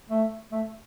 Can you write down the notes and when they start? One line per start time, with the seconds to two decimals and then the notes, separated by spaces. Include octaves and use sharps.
0.10 A3
0.52 A3